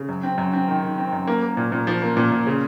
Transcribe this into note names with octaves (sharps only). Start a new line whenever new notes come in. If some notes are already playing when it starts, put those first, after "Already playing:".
Already playing: C#3
F#2
C4
F#2
C4
D#3
D#3
C4
F#2
A#3
A#3
A#2
A#2
F3
A#3
A#2
A#2
C#3